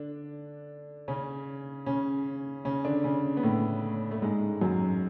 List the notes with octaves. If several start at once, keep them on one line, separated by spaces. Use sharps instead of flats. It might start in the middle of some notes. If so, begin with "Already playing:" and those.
Already playing: D3 D4
C#3 C#4
C#3 C#4
C#3 C#4
D3 D4
C#3 C#4
B3
A2 A3
A3
G#2 G#3
F#2 F#3